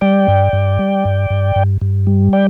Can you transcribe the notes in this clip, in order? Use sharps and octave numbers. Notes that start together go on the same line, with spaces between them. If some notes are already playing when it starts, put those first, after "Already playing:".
G3 D5 G5
G2
G2
G3
G2
G2
G2
G2
G3
D5 G5